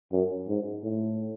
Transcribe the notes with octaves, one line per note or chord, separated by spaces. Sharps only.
F#2
G#2
A2